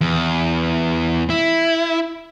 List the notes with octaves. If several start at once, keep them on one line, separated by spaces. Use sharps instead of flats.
E2
E4